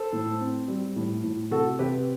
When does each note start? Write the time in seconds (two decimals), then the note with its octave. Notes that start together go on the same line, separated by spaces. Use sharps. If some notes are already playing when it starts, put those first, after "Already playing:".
Already playing: A4 C5
0.13 A2
0.41 C4
0.68 G3
0.96 A2
1.24 A2
1.51 C3 F#4 A4
1.79 C3 G4 B4